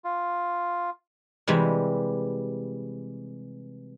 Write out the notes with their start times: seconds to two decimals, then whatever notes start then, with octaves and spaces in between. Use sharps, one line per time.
0.04 F4
1.47 C3 E3 G3 G#3